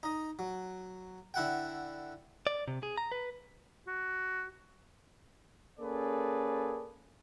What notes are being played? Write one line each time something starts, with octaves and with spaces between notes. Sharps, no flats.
D#4 D#5
F#3
D3 E4 F#5 G5
D5
C3
G#4
A#5
B4
F#4
A#3 C#4 G#4 A4 B4 D5